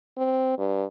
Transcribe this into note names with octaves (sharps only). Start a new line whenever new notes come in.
C4
G2